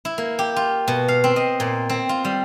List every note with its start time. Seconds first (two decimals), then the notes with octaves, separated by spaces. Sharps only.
0.05 E4
0.18 A#3
0.39 G4
0.56 F4
0.88 B2
1.08 F5
1.24 C4
1.36 D#5
1.60 A#2
1.89 C4
2.09 F4
2.25 G3